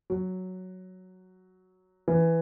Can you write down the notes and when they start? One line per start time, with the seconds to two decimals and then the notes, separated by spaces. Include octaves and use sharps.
0.10 F#3
2.08 E3